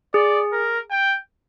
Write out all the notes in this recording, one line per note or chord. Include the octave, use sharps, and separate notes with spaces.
G#4 D5
A#4
G5